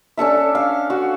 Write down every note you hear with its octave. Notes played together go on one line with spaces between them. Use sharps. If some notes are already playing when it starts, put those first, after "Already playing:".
C#4 D4 A4 E5
F5
F#4